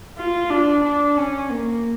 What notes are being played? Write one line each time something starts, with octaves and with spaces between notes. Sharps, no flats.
F4
D4
D4
C#4
A#3